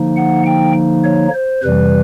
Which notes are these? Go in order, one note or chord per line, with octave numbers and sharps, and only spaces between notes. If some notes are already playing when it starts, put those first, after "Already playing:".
Already playing: D3 F3 A#3 D#4
F#5
G5
C#5
C5
F2 C3 E3 G3 B4